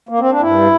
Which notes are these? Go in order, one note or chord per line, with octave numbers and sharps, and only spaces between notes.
A#3
C4
D4
G2 E4